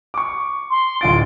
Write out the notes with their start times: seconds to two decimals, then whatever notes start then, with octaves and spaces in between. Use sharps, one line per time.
0.14 C#6 D6
0.70 C6
1.01 D1 F4 A6 D7